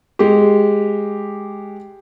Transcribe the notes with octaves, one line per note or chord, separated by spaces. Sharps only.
G#3 G4